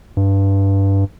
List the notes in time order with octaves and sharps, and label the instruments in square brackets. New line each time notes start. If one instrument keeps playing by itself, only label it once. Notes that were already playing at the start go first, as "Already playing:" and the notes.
[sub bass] G2